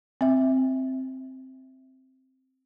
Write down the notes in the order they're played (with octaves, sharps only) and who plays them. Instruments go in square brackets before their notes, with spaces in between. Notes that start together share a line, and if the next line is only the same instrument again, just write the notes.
[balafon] C4 E5